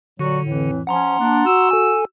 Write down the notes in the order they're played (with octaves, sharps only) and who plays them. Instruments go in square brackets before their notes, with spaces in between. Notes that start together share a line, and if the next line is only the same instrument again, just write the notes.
[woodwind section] A#2 F#3 F#4 [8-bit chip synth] D3
[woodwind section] F2 A2 E3
[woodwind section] F3 C#4 [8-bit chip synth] F#5 A#5 C6
[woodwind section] A#3 D4
F#4 E6
[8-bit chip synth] A4 G#5